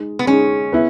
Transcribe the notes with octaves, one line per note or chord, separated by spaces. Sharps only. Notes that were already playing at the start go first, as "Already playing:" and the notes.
Already playing: G#3 D#4 G#4
B3
G#3 C#4 D#4 G#4
B3 E4